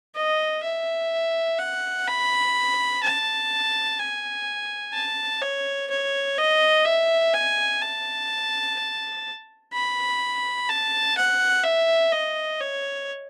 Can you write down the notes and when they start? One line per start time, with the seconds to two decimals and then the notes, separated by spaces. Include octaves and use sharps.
0.15 D#5
0.63 E5
1.59 F#5
2.07 B5
3.03 A5
3.99 G#5
4.94 A5
5.42 C#5
5.90 C#5
6.38 D#5
6.85 E5
7.34 G#5
7.82 A5
9.73 B5
10.69 A5
11.17 F#5
11.64 E5
12.12 D#5
12.60 C#5